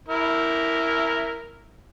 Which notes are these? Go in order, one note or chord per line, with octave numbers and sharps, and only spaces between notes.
E4 A#4